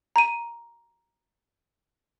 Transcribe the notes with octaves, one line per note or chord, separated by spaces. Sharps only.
A#5 D#7